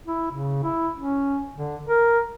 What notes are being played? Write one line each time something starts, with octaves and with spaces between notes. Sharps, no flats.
E4
C#3
E4
C#4
D3
A#4